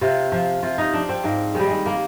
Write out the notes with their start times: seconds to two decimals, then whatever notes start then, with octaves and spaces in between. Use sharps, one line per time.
0.01 C3 F4
0.32 F3 F4
0.62 C3 F4
0.78 D#4
0.93 F3 D4
1.09 C4
1.24 G#2 A#3
1.55 D#3 G3 G#3
1.70 G#3
1.86 A#3